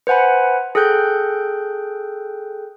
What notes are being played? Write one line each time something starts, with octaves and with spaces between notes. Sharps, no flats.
B4 C5 F#5 G#5 B5
G#4 A4 G5 F#6 G6